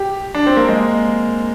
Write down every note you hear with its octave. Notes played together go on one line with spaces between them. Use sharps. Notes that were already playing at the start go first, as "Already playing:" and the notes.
Already playing: G4
D4
C4
A#3
G#3